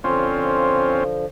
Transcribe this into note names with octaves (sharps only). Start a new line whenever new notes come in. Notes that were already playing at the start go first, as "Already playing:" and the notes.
D3 F3 C4 C#4 F4